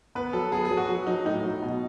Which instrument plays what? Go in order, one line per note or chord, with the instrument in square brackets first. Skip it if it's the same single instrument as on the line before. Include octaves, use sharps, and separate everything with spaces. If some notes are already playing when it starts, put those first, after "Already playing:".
[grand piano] B3 [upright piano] B4
[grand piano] F#3 [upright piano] A4
[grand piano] B3 [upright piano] G#4
[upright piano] G#4
[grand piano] F#3
[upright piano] F#4
[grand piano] F#3
[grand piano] F#3 [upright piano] D#4
[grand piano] A2 [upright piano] D#4
[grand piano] F#3
B2